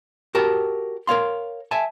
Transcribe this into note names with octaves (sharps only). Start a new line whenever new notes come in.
F#4 G4 A#4 A5
A#4 C#5 F5 C6
E5 G#5 A5